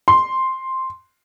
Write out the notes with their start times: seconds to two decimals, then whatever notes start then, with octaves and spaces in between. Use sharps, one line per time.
0.08 C6